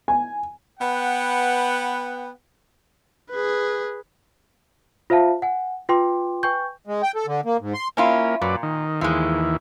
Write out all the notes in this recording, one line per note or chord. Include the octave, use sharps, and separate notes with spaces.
G#5
B3 B4 F#5 G5
G#4 B4
F4 C5 E5 F5 A5
F#5 G#5
F4 B4 G5 C6 D6
B4 G5 G#5 C#6 G6
G#3
G5
A4
D3
A#3
G#2
C6
A#3 C#4 E4 F4
F#2 A#2 B4 D5
D#3
D#2 E3 F3 G#3